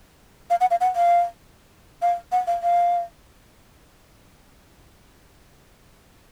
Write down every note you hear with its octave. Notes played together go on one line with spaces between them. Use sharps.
F5
F#5
F5
F#5
F5
F5
F#5
F5
F5